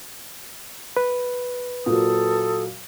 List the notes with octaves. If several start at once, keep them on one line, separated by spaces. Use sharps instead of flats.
B4
A#2 F#3 A4 D#6